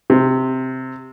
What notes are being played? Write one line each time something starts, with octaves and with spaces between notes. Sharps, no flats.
C3